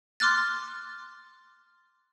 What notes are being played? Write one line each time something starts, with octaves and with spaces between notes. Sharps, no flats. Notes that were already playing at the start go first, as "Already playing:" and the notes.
C6 D6 F6 F#6 A6